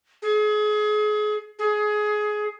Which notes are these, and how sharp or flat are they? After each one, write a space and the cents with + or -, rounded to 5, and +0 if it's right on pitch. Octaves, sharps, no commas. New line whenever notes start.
G#4 +30
G#4 +20